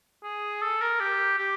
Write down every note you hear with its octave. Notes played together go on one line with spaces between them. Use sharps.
G#4
A4
A#4
G4
G4